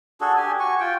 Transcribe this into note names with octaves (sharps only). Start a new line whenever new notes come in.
D4 F#4 G#4 A4
G4 G#5
F#4 G#5 C#6
F4 G5